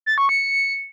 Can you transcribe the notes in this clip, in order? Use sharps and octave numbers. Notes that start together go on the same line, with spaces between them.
A6
C#6
C#7